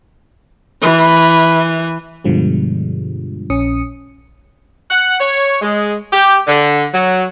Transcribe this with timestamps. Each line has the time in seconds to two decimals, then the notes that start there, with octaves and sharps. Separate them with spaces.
0.83 E3
2.24 G2 B2 D3 F3 G3 G#3
3.50 A#1 C#4 D#6 C#7
4.90 F#5
5.20 C#5
5.62 G#3
6.12 G4
6.47 D3
6.93 F#3